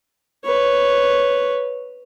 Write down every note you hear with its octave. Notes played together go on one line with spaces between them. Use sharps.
B4 C#5